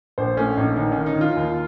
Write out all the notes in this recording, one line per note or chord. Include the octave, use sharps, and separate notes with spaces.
A#1 C5
A3 C#4
A#1 D#4
D#3 D#4
D#3 C#4
D#4
D#3
F4
D#2